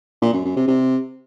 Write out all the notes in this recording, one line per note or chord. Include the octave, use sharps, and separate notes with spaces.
A#2
F#2
F#2
C3
C3